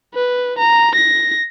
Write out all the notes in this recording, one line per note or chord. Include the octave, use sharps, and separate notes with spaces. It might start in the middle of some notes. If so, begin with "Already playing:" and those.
B4
A#5
A#6